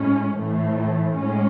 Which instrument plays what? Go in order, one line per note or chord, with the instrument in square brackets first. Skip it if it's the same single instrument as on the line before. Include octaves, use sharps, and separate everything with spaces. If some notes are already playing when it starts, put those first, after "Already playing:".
Already playing: [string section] A2 G#3 C#4
A2 E3 A3
A2 G#3 C#4